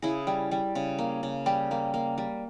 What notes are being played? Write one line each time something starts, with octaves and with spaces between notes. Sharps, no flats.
C#3 E4 G#4
G3
G3
C#3
A#3
C#3
G3 G4
A#3
A#3
G3